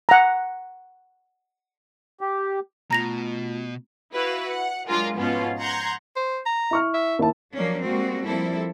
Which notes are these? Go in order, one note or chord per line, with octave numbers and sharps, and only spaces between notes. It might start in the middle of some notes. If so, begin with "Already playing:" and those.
F#5 A#5
G4
B2 A3 F4 A#5 A#6 F7
E4 F#4 B4 F5
F#5
F#3 G#3 D4 F4 G#4 A#4
G#2 B2 F3 B3 C#4 F4
F#5 A#5 C6 G6 G#6
C5
A#5
E4 C#6 F6
E5
D#2 E4 A5
F3 F#3 A#3 C#4 D4
G3 G#3 A#3 C4 F#4
F3 G3 A#3 C4 E4 A4